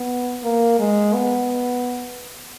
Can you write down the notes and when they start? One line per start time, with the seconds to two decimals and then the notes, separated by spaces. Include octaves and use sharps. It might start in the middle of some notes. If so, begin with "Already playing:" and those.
Already playing: B3
0.43 A#3
0.79 G#3
1.14 B3